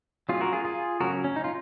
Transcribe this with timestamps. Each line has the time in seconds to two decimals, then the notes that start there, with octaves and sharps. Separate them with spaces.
0.29 F#3 C#4 F4 G#4
0.41 F#4 A#4
0.53 F4 G#4
0.65 F4 G#4
1.00 C#3 F#3 C#4 F#4 A#4
1.24 C#4
1.36 D#4
1.44 F4